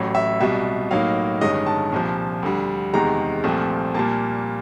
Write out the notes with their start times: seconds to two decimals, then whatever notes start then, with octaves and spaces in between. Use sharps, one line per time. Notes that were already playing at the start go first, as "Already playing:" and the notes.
Already playing: A1 A2 F#3
0.15 E5
0.40 C2 B2 G3 E5
0.91 A2 F#3 A#3 D#4 F5
1.41 G1 G2 D#3 G#3 C#4 D#5
1.66 A5
1.92 C2 A#2 F3
2.43 D2 D3 G3
2.93 E2 C3 D#3 G#3 A#5
3.44 C2 A#2 F3 A3 C4
3.94 A#2 G3 A#3 A5